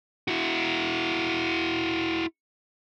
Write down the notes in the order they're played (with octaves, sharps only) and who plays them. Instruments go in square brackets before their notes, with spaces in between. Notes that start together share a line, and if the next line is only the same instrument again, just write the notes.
[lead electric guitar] E4 F#4